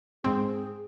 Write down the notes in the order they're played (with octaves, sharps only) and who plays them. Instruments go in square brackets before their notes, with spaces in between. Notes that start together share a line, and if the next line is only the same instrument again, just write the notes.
[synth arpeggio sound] G#2 C4 [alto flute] G#4